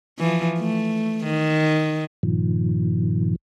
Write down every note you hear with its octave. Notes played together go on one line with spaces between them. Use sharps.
E3 F3
A3
D#3
G2 A#2 D#3 F3